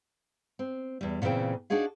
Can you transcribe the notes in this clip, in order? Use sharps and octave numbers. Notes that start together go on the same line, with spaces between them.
C4
E2 G3
A#2 C#3 E3 C4 G5
D4 D#4 F#4 G#4 F5